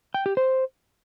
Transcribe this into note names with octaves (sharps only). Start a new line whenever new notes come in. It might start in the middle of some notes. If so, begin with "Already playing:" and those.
G5
G4
C5